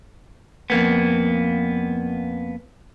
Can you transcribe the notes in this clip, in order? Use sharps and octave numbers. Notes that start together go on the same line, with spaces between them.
F2 A#3 B3